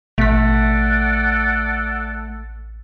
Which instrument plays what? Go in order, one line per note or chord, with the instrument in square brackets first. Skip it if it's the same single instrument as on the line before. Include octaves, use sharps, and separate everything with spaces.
[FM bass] A1 [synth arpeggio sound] B2 B6 [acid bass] A3 [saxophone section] A4 D5 F#5